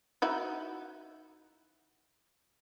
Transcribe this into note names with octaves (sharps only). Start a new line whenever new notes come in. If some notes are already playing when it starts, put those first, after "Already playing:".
D#4 E4 F#4